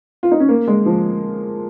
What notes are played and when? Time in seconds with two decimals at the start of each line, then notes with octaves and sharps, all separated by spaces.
0.23 F4
0.31 D#4
0.40 C#4
0.49 A#3
0.68 G#3
0.86 F3